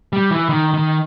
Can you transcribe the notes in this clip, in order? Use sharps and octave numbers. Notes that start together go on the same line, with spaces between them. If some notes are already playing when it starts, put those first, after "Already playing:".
G3
E3
D#3
D#3